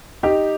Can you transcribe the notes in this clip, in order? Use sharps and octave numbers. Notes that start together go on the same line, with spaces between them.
D#4 G4